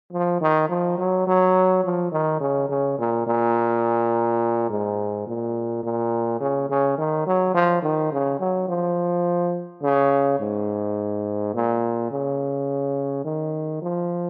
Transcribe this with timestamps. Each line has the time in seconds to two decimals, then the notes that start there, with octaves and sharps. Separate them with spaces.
0.12 F3
0.41 D#3
0.69 F3
0.98 F#3
1.27 F#3
1.84 F3
2.12 D#3
2.41 C#3
2.69 C#3
2.98 A#2
3.27 A#2
4.70 G#2
5.27 A#2
5.83 A#2
6.40 C#3
6.69 C#3
6.98 D#3
7.26 F#3
7.54 F3
7.82 D#3
8.12 C#3
8.40 F#3
8.68 F3
9.82 C#3
10.40 G#2
11.54 A#2
12.11 C#3
13.25 D#3
13.82 F3